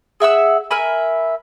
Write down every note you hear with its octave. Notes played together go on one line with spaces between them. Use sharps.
G#4 E5 F#5 E6
A#4 E5 G#5 B5